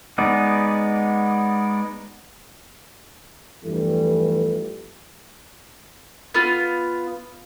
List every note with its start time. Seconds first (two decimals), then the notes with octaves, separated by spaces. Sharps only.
0.18 G#3 B3 D#4 D5
3.65 E2 G2 E3 F3 G3 A3
6.34 B3 F4